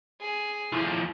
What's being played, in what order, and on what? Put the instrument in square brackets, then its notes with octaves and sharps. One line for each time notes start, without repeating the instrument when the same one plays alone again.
[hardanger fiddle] G#4
[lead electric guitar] D#2 F3 [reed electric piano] E4